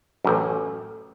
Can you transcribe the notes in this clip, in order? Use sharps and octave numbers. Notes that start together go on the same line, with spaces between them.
A1 F#2